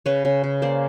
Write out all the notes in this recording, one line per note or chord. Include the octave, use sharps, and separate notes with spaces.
C#3 B4 C#5
C#3
C#3
A#3 C5 D5